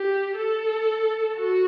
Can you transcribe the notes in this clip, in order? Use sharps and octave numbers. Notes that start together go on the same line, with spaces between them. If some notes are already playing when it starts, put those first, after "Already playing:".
Already playing: G4
A4
F#4